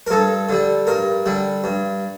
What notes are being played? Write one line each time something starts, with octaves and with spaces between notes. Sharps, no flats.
A#4
G2 A4
D3 G3
G2 A#4
D3 G3
G2